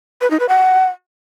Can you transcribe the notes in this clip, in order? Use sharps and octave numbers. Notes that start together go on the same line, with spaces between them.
B4
D#4
B4
F#5